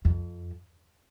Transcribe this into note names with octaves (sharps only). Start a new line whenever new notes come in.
F2